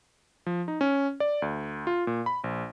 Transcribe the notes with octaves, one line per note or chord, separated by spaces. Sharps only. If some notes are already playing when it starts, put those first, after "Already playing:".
F3
D#4
C#4
D5
D2
F4
A#2
B5
A#1